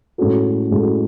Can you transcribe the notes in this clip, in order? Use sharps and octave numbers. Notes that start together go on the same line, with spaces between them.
A2 G#3 C#4 F#4 A4
A2 G#3 C#4 F#4 A4